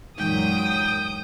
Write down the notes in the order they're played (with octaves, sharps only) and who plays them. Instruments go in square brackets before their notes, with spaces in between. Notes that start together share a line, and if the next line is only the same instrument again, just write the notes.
[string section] F#2 A#2 F#3 [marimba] E3 G#3 D#4 [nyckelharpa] G5 [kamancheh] D#6